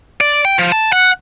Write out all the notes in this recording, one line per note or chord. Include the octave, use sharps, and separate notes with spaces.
D5
G5
F3
A5
F#5